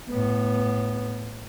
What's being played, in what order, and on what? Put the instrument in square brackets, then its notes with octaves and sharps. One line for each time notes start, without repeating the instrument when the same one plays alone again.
[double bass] A2 B3